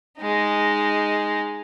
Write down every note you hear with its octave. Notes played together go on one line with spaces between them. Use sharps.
G#3 D#4